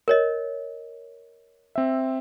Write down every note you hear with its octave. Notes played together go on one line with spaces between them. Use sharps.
A#4 C#5 D#5
C4 E5